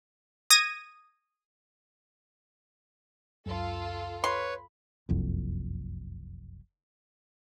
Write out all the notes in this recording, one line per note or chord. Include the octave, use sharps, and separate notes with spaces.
D#6 G#6 A#6 D#7
C#2 F#2 F4 A4
B4 C#5 B5 C6
F#1 C2 F2